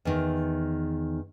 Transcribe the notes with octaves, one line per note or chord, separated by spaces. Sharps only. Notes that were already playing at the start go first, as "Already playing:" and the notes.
E2 D#3